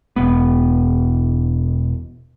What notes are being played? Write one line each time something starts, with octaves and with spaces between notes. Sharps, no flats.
E1 B3